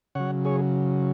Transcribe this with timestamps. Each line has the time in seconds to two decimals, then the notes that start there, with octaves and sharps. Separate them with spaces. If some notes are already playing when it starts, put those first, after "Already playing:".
0.15 C#3 F#3 C#5 F#5
0.45 G#4 C#5